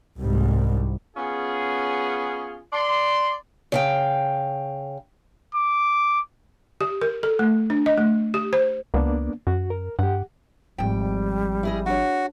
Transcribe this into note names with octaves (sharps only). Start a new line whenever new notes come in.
C2 G#2 G3
B3 C#4 F4 G#4
D5 C6
C#3 F5 G5
D6
G4
A#4
A4
A3
D4
D#5
A3
G4
C5
C#2 A#3 B3 D4
F#2 F#4
A#4
G2 G4 F#5
G#1 F3 G3 G5
E4 G#4 D#5
D4 F#4 C#5